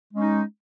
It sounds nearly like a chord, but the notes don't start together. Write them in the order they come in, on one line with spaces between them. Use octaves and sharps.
G#3 C#4 D#4